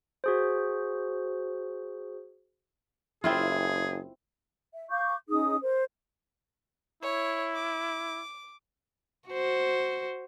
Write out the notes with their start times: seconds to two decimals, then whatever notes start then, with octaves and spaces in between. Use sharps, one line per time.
0.24 F#4 G#4 C5
3.24 F#1 C4 E4 F4 G#4
4.72 E5
4.90 F5 C#6 D6 G6
5.29 C#4 D#4 G#4 D#6
5.61 A#4 C5
7.03 E4 C#5
7.55 D6
9.29 F#4 C5